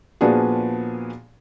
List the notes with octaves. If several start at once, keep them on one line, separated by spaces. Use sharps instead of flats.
A#2 F3 B3 D4 F#4 G#4